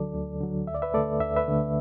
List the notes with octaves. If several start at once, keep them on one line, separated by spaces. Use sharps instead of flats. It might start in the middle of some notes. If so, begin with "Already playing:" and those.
Already playing: D2 D3 F#3 A4 D5
D2
D3 F#3
D2 E5
D5
B4 E5
D3 A3 A4 D5
D2 E5
B4 E5
D3 A3